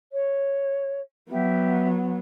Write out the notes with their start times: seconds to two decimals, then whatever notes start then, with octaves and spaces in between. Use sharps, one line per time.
0.12 C#5
1.30 F#3 B3 G4 E5